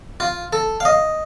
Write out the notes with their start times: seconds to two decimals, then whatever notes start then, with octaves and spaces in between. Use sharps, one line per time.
0.20 F4
0.53 A4
0.80 F5
0.85 D#5